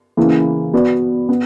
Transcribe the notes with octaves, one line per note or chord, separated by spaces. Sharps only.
C#3 E3 A#3 E4
B3 F#4 B4 D5
B3